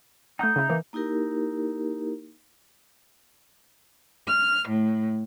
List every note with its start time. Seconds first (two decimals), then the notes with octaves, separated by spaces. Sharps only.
0.39 A3 D#4 F#5 D#6 G6
0.56 C#3 E4
0.69 E3 A#3
0.93 A#3 D#4 E4 G4 A#4
4.26 F6
4.67 A2